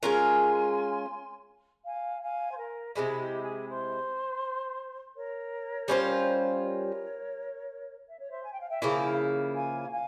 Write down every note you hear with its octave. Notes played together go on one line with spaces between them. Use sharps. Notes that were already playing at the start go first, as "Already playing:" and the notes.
G#3 C#4 F4 A#4 G#5 C6
F5 G#5
F5 G#5
C5
A#4
C3 F3 G#3 E4 G#4
G4
G#4
C5
A#4 C#5
G3 C#4 F4 C5
A#4 C#5
E5
C#5
C5 E5
G#5
G5
F5
E5 G5
C#3 F3 A#3 E4 F5 G#5
F5 G#5
F5 G#5